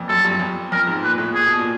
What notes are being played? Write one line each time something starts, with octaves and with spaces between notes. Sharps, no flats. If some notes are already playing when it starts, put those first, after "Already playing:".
Already playing: F2 A#2
F#2 A4
G2
F2
F2 A#4
G#2
A#2 B4
A2
A#2 G#4
B2
A#2